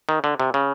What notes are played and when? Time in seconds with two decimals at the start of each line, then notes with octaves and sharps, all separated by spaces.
0.09 D#3
0.24 D3
0.40 C3
0.54 C#3